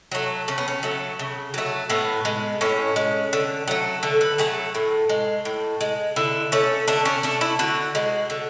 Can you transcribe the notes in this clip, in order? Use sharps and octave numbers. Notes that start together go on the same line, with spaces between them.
F#3 A3
C#3 C#4
B3
C#4
F#3 A3
C#3
F#3 A3
A2 B3
G#3
A2 C#4
G#3
D3
F#3 A3
D3 A4
B4
F#3 A3 G#4
A2
G#3
A2
G#3
D3 E4
A3 C#4
D3 D4
C#4
A3 D4
E4
D3 F#4
G#3
D3